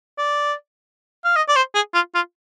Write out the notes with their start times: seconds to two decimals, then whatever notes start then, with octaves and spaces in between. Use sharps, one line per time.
0.18 D5
1.25 F5
1.36 D#5
1.48 D5
1.56 C5
1.75 G#4
1.94 F4
2.15 F4